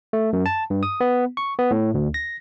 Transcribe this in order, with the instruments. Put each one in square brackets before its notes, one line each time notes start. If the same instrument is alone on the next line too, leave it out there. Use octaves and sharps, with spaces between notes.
[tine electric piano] A3
F#2
A5
G2
D#6
B3
C#6
B3
A2
D2
A#6